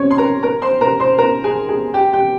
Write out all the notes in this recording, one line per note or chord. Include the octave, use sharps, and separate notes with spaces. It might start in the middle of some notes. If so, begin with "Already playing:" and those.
Already playing: C4 C#4 C#5
C6
A#4 A#5
A#4 A#5
C5 C6
A#4 A#5
C5 C6
A#4 A#5
G#4 G#5
G#4 G#5
G4 G5
G4 G5